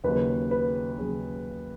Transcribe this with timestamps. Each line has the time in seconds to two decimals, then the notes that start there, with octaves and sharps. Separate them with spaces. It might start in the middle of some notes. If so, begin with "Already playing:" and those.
0.04 D#2 C#3 F#3 C#4 B4
0.51 B4
0.98 D#2 C#3 F#3 C#4 G#4